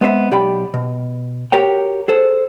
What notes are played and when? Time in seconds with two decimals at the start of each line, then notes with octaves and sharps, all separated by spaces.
0.01 G#3 B3 C4 C5 E5
0.31 B1 G4 D5 G5 B5
0.74 B2
1.52 F#4 G4 A#4 C#5 G5
2.08 G#4 A4 C5